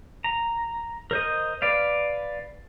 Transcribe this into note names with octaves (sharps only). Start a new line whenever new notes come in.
A#5
A#4 C5 D#5
B4 D5 F5